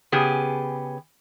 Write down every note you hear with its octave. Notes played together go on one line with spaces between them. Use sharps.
C#3 B3 G4 G#4